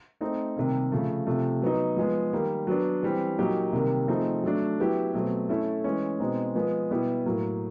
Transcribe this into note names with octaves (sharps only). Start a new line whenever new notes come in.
A3 C4 D#4
C3 D#3 G3 A#3
C#3 F3 A3
C3 F3 A3
F#3 B3 D#4
F3 G#3 B3
D#3 G3 A#3
F#3 B3 D4
E3 G3 C4
A#2 F#3 A#3 D#4 G4
C3 D#3 G3 A#3
F3 A3 C4 D#4 G#4
F#3 A3 D4
F#3 B3 E4 G4
B2 F#3 A3 C4
A3 C#4 E4 A4
E3 G#3 C#4
B2 G#3 C4 D#4
F3 G#3 B3
B2 G3 B3 E4 G4
A2 F#3 A#3